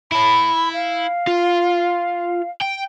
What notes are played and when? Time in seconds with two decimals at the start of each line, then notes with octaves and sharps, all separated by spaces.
0.12 E4 A5 B5
0.73 F5
1.27 F4
2.61 G5